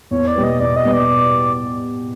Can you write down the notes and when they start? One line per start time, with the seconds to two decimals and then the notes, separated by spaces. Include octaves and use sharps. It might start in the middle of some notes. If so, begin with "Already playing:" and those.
0.11 E2 C#5
0.27 D5
0.35 B2 G3 B3
0.43 D#5
0.60 E2 D5
0.76 D#5
0.85 B2 G3 B3
0.93 D5